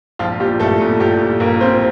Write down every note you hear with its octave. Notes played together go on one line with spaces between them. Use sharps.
A#1 F3 F4
A#2 G3 G4
A#1 A3 A4
A#2
A#1 G3 G4
A#2
A#1 A#3 A#4
A#2 C4 C5